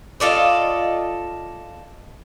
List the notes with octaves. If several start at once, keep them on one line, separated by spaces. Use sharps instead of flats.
F4 A4 D5 D#5